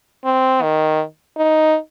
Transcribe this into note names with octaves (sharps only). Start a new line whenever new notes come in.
C4
D#3
D#4